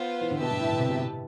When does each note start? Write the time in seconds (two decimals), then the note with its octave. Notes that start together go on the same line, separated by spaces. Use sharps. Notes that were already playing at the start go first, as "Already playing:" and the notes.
Already playing: B3 F4 C5
0.21 E3
0.31 D3
0.41 B2 G4 B4 E5 A5
0.51 G2
0.60 A2
0.70 D3
0.79 C3
0.89 B2
0.99 A2